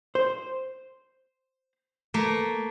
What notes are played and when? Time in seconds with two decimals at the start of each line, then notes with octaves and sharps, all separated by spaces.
0.15 C5
2.14 A3 A#3